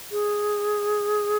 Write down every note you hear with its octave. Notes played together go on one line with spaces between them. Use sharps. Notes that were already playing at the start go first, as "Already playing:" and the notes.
G#4